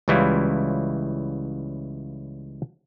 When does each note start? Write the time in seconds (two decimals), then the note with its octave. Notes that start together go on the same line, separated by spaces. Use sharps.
0.08 C#2 C#3 E3 G3 E4 F4